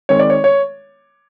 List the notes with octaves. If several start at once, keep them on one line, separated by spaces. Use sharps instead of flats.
D#3 G#3 C4 C#5
D5
C#5
C#5